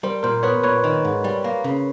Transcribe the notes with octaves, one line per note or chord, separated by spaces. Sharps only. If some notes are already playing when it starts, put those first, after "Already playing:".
G3 A#4 C5
A#2 A#4 C5
B3 B4 C#5
A#2 B4 C#5
D#3
G#2
G3
A#3
C#3